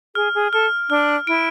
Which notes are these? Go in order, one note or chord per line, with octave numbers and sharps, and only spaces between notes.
G#4 F6
G#4
A4 F6
D4 F6
E4 D7